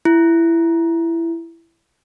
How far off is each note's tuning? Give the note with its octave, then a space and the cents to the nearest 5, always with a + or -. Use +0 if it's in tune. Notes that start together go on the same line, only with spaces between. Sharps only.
E4 +15